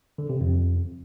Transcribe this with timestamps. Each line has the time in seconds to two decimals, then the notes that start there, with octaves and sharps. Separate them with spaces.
0.18 D3
0.30 C3
0.41 F2